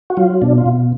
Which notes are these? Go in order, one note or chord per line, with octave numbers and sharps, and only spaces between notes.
F#4
F#3 F4
B2 D4
F4
B2